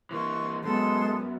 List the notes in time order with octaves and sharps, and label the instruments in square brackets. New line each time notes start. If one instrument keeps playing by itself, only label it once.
[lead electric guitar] E3 A#3 [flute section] C6 C#6
[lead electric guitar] F#2 [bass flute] G#3 [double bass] B3 [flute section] A4 C6